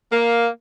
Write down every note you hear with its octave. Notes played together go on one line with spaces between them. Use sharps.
A#3